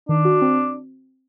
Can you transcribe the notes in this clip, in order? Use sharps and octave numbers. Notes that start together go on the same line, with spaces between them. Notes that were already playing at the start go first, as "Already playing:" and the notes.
D#3 D4
F#4
C4